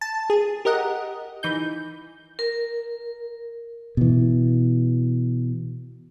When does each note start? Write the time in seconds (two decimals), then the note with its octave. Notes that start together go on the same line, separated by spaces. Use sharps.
0.01 A5
0.30 G#4
0.65 G4 A#4 D#5 F#5
1.43 E3 D#4 G6
2.39 A#4
3.97 B2 E3